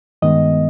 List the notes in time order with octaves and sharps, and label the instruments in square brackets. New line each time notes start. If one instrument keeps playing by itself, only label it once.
[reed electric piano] G2 D#3 G#3 B3 D#5